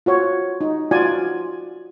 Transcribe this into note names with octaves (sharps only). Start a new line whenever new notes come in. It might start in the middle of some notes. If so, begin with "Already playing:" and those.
F4 F#4 C#5
D#4
F4 F#4 D5 G#5